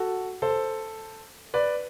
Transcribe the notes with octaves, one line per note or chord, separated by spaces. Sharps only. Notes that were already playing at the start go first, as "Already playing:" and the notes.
Already playing: F#4 A4
A4 C5
B4 D5